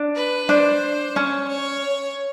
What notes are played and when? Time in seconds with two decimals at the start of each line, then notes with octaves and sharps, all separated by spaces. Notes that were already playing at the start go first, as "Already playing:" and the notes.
Already playing: D4
0.16 B4
0.49 D4 C5
1.16 C#4 C#5
1.49 C#5